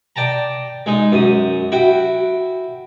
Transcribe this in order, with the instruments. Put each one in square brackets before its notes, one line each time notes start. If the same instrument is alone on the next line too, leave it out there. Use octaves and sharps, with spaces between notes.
[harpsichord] D5 G5 A5 A#5
G#3 D#4
F#2 D#6
E4 F#4 G5